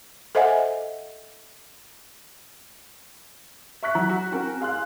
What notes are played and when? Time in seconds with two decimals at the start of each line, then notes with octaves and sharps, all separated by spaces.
0.35 A4 C5 D#5 E5 F#5 G#5
3.83 E5 C#6 F#6 B6
3.95 F#3
4.10 F#4
4.32 C4 C#4 F#4 A#4
4.60 G#4 F5 C6 F#6